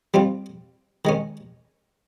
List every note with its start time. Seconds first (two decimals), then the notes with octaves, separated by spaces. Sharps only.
0.14 G3 C4 F4
1.05 D#3 G#3 C#4